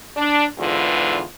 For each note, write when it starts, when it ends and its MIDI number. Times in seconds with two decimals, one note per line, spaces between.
0.17 0.46 62
0.59 1.23 40
0.59 1.23 44
0.59 1.23 50
0.59 1.23 65
0.59 1.23 71